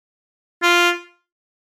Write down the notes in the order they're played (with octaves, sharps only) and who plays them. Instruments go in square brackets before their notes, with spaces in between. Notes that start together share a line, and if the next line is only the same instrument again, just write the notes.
[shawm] F4